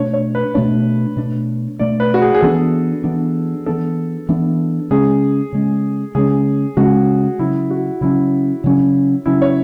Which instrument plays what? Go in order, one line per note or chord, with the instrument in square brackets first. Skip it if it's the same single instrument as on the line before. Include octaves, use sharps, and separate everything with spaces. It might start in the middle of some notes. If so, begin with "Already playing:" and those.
Already playing: [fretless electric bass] B2 A3 D4 [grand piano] C#5
[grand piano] C#5
B4
[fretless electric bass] B2 A3 D4 [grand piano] C#5
[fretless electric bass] B2 A3 D4
[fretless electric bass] B2 A3 D4 [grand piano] D5
[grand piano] B4
F#4
G#4
G#4
[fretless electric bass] E3 B3 D4 [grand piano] A4
[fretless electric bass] E3 B3 D4
[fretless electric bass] E3 B3 D4 [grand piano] A4
[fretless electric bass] E3 B3 D4
[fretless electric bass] C#3 G#3 C#4 [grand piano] G#4
[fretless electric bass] C#3 G#3 C#4
[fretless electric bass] C#3 G#3 C#4 [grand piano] G#4
[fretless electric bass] C#3 G#3 C#4 [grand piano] F#4
[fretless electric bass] C#3 F#3 C#4 [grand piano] E4
[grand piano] F#4
[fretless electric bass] C#3 F#3 C#4 [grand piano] E4
[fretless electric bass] C#3 F#3 C#4
[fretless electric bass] C#3 F#3 C#4 [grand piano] E4
[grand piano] C#5